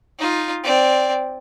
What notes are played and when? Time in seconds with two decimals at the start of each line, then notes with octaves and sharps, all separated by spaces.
0.18 D#4 F4
0.63 C4 D5